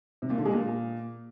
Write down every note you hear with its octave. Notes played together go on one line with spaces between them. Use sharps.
C3
A#2
D3
G#3
A#2